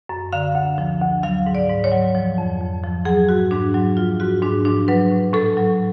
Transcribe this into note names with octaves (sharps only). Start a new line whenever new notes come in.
F#2
D3 F5
D2
F3
D2
F#3 F5
G#2
D5
G#2
C#5
F#3
F3
F2
F2
F3
F#3 G#4
G#2 F#4
G#2 D4
F#3
F3 F4
G#2 F#4
G#2 D4
F3 D4
F#3 B4
A2
A2 A4
F#3